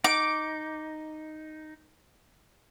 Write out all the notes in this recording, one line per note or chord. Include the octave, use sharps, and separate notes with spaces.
D#4 D6